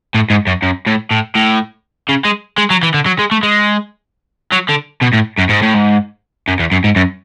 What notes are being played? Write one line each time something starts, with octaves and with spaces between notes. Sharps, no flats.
A2
G#2
F#2
F#2
A2
A2
A2
C#3
G#3
G#3
F#3
E3
D3
F#3
G#3
A3
G#3
F#3
D3
B2
A2
F#2
G#2
A2
G#2
F#2
E2
F#2
G#2
F#2